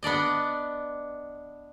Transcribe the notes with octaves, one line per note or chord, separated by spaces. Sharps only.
B3 D4 D5 D#5